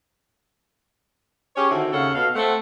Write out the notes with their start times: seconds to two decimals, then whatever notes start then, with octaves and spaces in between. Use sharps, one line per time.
1.56 C#4 G4 G#4 C#5
1.70 D3 D#3 C4 E4 F#4
1.92 D#2 C#3 A4 C#5 F5 F#5
2.13 B2 A4 F5
2.35 A3 C4 F#5